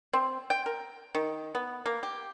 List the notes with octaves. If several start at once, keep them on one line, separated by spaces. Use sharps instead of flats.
C4
G5
A#4
D#3
B3
A#3
G4